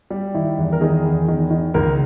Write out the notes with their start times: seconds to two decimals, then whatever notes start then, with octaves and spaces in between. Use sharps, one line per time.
0.10 G3
0.35 D#3 E4
0.58 E2
0.72 A#4
0.81 D#3 G#4
1.05 E2
1.28 D#3
1.51 D#3
1.74 C#2 A#4